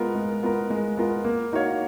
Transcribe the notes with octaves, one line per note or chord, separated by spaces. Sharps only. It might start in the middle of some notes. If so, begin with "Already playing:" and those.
Already playing: G#3 B3 F4 A#4
G#3
B3 F4 A#4
G#3
B3 F4 A#4
A#3
D#4 F#4 C#5 F5